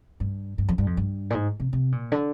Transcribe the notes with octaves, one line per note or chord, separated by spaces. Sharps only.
G2
G2
F2
G2
F2
G2
A#2
G#2
C3
C3
A#2
D3